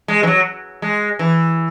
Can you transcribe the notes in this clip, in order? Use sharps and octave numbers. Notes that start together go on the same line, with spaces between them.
G#3
E3
F#3
G#3
E3